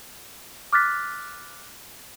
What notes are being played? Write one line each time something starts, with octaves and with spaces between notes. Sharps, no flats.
D6 F6 F#6 A6 B6